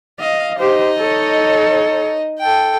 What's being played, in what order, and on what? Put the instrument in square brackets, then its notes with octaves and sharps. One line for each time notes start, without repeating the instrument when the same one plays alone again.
[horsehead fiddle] D#5 [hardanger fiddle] F5
[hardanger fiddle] D#4 D#5 [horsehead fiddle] G4 C5
[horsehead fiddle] A4 C#5
[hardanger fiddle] A4 G5